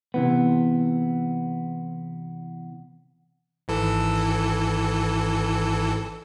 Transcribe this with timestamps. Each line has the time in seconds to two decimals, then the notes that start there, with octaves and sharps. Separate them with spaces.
0.14 C3 E3 B3
3.68 G#1 E3 A4